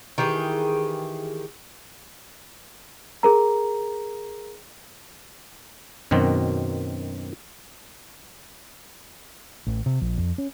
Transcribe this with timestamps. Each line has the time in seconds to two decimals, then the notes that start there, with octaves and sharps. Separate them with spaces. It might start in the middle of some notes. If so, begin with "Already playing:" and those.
0.18 D#3 E3 G4 G#4
3.23 G#4 A#4 A#5
6.11 F#2 B2 D#3 C4
9.66 A1
9.86 C3
10.01 A#1
10.18 F2
10.38 C#4